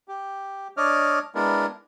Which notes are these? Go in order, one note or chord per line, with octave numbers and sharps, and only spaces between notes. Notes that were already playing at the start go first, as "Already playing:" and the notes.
G4
D4 C#5 D#5 D6 F6
G#3 B3 D4 E4 A#4